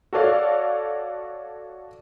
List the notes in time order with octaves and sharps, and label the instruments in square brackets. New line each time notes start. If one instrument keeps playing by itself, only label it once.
[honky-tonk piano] F#4 A4 C#5 D5 F5